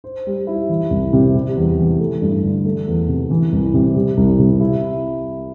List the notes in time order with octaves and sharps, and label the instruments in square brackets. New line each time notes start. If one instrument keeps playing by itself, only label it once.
[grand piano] C5
G3
E4
E3
C2
C3
G3
E2
E3
A3
G2
D3
A3
E2
C3
E3
C2
C3
G3
C2
C3
E4